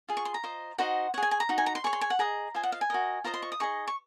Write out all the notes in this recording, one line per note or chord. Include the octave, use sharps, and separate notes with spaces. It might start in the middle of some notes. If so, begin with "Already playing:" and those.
F4 G#4
C#6
C6
A#5
F4 C5 D#5
D#4 F#4 C5 D#5 F#5
G#4 C#5 F#5 G#5
G#5
A#5
D#4 F#4
G#5
A#5
C6
G#4 C#5 C#6
C6
G#5
F#5
G#4 D#5 A#5
F4 C5 D#5 G#5
F#5
F5
G#5
F#4 A#4 D#5
F4 C5 D#5 A#5
C6
C#6
D#6
D#4 G#4 D#5 C#6
C#6